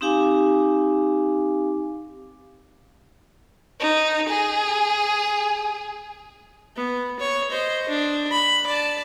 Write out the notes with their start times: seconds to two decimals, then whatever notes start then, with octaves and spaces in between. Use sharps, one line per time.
0.01 C4 D#4 G4 F5 G#5 D6
3.80 D#4
4.29 G#4
6.76 B3
7.20 C#5
7.51 C5 D#5
7.89 D4
8.31 B5
8.67 D5 A5